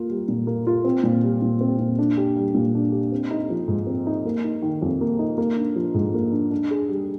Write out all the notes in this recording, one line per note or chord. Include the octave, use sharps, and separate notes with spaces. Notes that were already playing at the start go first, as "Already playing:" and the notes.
Already playing: A#3 F4
G3
A#2
A#3
F4
C4
A#2
G3
A#2
C4
A#2
D4
G4
G3
A#2
D4
G4
C4
D#4
F3
G#2
C4
D#4
A#3
D#4
D#3
F2
A#3
D#4
A#3
D4
F3
G#2
A#3
D4
D4
G#4
G3